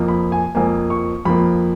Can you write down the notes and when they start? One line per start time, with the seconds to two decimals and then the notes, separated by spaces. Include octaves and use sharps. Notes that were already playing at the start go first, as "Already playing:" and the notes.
Already playing: F2 F3 A#3
0.08 B5
0.32 G#5
0.55 F2 F3 A#3 G#5
0.90 C#6
1.25 F2 F3 A#3 B5